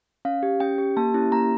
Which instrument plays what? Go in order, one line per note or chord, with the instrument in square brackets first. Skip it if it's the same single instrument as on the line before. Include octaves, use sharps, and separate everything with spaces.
[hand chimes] C#4 F5
G4
C#4 G5
G4
A#3 A5
C#4 E4 G4
A#3 A#5